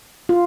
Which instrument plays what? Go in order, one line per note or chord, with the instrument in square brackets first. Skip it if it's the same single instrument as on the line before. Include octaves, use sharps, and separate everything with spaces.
[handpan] F4